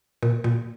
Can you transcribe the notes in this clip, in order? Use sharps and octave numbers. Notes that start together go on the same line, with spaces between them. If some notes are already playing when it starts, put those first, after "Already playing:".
A#2
A#2